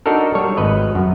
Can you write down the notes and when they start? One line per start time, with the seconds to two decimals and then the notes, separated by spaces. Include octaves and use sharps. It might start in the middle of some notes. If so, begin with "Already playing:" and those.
0.06 D4 D#4 F#4 A4 A#4
0.35 G3 C#5
0.57 G#1 B4 D#5
0.95 F#2